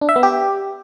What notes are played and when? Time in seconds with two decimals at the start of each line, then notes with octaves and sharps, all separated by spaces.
0.01 D4
0.09 E5
0.16 B3
0.23 G4